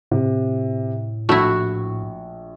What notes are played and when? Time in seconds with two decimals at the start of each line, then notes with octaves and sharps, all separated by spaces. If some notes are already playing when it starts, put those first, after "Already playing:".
0.11 A2 C3
1.29 A#1 A3 E4 F#4